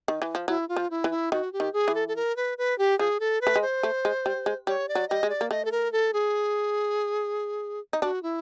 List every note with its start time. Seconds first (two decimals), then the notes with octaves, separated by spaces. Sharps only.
0.08 D#3
0.22 E3
0.35 F3
0.48 F#3 E4
0.69 F4
0.76 F3
0.91 E4
1.04 E3
1.11 E4
1.32 D#3 F#4
1.53 G4
1.60 D#3
1.73 G#4
1.88 E3
1.95 A4
2.08 A4
2.16 A#4
2.37 B4
2.58 B4
2.78 G4
2.99 F3 G#4
3.20 A4
3.41 B4
3.47 A3
3.56 G#3
3.62 C5
3.83 A3
4.05 G#3
4.26 G3
4.46 G#3
4.67 G3 C#5
4.89 D5
4.95 F#3
5.09 G3 D#5
5.23 G#3
5.30 D5
5.41 A#3
5.51 A3 D#5
5.65 A4
5.72 A#4
5.93 A4
6.14 G#4
7.93 D#4
8.02 D4 F#4
8.23 E4